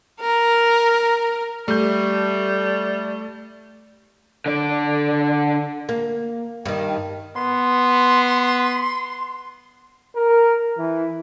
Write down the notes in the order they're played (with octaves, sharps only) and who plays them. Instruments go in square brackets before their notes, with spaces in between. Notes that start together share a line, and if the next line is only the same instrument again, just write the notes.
[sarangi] A#4
[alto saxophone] G3 [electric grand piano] A3 G6
[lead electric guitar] D3 D5
[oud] A#3
G2 D#3
[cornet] B3 [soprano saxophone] C6
[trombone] A#4
E3